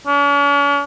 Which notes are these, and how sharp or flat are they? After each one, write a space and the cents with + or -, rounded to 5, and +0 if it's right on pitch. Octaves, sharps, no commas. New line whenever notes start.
C#4 +45